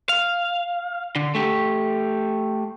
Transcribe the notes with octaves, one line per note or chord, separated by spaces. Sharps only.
F5
D3
A3 G4